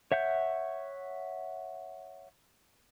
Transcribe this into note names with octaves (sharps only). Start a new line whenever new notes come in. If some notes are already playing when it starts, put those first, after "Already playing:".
C#5 E5 F#5 G6